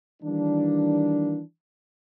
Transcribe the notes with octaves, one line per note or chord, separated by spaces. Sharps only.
D#3 E3 G3 A#3 D4